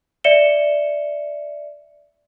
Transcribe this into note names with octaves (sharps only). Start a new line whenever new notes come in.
D5 E5 C#7 E7 G7